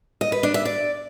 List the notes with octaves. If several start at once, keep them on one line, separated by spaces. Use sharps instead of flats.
D#5
B4
D4
E5
D5